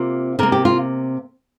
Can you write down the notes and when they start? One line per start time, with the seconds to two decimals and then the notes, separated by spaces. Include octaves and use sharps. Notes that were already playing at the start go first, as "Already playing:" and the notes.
Already playing: C3 A#3 F4
0.39 C3 A#3 A#4
0.52 G4
0.65 F4